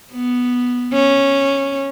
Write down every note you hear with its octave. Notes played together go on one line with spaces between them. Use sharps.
B3
C#4